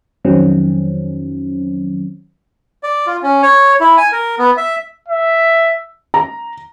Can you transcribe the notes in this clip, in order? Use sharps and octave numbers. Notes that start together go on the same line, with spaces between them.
F2 D#3 F#3 C4 C#4
D5
F4
C#4
C#5
E4
G#5
A#4
B3
E5
E5
A#5